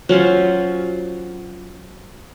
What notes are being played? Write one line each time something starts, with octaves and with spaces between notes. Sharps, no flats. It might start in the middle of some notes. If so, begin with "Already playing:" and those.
F#3 C#4 F4 C5